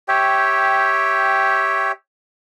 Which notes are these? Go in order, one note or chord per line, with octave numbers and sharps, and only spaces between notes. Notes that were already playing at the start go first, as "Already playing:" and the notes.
G4 C#5 E5 G5